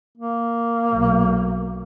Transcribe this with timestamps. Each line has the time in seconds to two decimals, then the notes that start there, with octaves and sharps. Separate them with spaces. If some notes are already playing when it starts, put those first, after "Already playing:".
0.17 A#3
0.88 B1 A#2